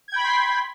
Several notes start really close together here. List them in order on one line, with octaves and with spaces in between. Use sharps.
G#6 G5 B5 B6 C6